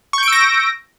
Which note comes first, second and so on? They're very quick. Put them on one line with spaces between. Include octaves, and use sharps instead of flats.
C#6 G6 D7 E6 A#6